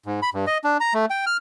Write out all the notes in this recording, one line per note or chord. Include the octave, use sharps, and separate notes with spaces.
G#2
B5
G2
D#5
D4
A#5
A3
G5
F6